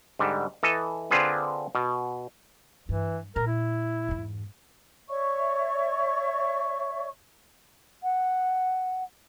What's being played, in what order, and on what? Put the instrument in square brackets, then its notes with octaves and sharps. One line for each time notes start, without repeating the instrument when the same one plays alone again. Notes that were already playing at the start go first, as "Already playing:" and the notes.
[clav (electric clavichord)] G#2 D3 G3
E3 A4 D#5
D3 C4 D4 F4 G#4 B4
B2
[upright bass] G2 [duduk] E3
[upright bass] A#2 [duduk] A#4
[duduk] E4
[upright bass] E2 G#2
[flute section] C#5 D5 E5 C#6
[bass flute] F#5